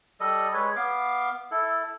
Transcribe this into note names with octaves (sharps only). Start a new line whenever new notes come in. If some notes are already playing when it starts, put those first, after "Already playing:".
G3 A4 D#5
G#3 B4 C#5
B3 F5 D6
E4 A4